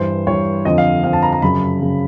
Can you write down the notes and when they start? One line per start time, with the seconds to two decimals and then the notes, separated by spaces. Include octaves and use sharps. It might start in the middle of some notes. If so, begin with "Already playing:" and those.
Already playing: G2 E3 C5
0.27 G2 E3 C#5
0.65 F2 D3 F3 D#5
0.78 F5
1.04 F2 D3 F3 F5
1.13 A5
1.22 A#5
1.33 A#5
1.42 F#2 C#3 F#3 B5
1.81 C#3 F#3